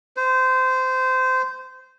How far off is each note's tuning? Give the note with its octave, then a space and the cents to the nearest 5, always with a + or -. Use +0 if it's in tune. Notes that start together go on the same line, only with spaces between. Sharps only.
C5 -20